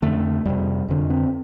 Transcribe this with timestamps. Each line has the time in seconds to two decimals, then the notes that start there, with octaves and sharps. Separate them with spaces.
0.02 F2 D3 A3
0.45 F2 C3 G3
0.88 F2 D3
1.10 C4